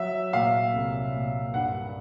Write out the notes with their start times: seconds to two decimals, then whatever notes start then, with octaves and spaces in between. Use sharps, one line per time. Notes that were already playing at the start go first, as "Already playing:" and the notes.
Already playing: F#3 E5
0.33 A#2 F5
0.74 C2
1.14 A#2
1.54 G2 F#5